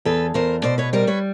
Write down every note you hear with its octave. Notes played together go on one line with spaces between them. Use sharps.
E2 A4 B4
E2 A#4 C5
B2 C5 D5
B4 C#5
G3 A#4 C5
B4 C#5